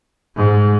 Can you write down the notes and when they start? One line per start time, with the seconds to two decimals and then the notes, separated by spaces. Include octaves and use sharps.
0.37 G#2